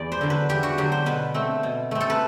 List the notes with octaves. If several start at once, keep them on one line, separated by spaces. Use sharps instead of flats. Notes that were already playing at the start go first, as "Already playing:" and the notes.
Already playing: E2 D5
C5
D3 F#3
B4
E2 G4
F#4
D3 F#3 G4
C5
B2 B4
A3 C4
B2
A3 C4
A4
B4